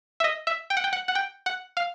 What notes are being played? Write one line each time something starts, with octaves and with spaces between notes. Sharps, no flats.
E5
D#5
E5
G5
F#5
G5
F#5
F#5
G5
F#5
F5